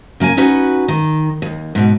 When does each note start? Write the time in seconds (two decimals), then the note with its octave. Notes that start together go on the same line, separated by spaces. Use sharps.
0.20 C#3 A#3 G5 G#5
0.37 C#4 D#4 F#4 B4
0.88 D#3
1.42 D#2
1.75 G#2 B2